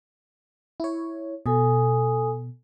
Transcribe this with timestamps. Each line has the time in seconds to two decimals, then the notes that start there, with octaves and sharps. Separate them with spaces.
0.80 E4 C#5
1.46 B2 A4 G#5 D#6